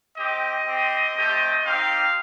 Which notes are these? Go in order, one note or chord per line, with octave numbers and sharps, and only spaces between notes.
C4 G4 D#5
C4 G4
A3 C4 G4
C4 D#4 G4 F5